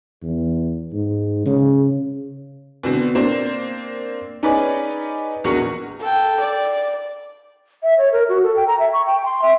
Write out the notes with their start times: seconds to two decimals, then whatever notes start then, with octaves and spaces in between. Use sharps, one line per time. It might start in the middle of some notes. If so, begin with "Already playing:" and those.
0.23 E2
0.93 G#2
1.46 C#3
2.83 B2 D3 C4
3.15 A#3 C4 D4 C5
4.43 C#4 D#4 G#4 B4 D5
5.44 A#1 E2 F#4 A#4 C#6 C#7
6.01 A4 G5
6.41 D5
7.83 E5
7.98 C#5
8.12 A#4
8.29 F#4
8.43 A4
8.56 G5
8.67 A#5
8.79 E5
8.93 C#6
9.06 G5
9.26 C6
9.42 E5